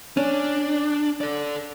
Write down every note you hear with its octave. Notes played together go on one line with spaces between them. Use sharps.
C#4 D4
A4 D5